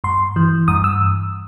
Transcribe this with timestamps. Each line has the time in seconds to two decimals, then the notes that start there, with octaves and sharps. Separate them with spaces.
0.04 G2 C6
0.36 E3
0.68 G2 D#6
0.84 E6